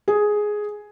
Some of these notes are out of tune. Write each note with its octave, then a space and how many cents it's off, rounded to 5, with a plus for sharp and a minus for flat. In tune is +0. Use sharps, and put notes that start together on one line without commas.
G#4 +5